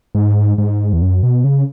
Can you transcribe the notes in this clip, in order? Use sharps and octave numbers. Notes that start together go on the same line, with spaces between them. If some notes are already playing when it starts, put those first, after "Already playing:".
G#2
G#2
E2
F#2
B2
C#3